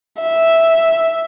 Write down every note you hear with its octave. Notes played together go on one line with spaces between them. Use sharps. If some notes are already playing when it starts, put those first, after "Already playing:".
E5